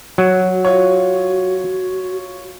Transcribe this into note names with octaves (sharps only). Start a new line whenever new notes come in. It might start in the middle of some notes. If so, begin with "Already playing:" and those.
F#3 F#4
F4 C#5